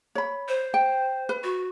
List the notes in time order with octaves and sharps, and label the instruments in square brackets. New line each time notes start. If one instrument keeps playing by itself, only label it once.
[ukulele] C#5 B5
[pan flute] C5
[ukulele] G5
B4
[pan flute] F#4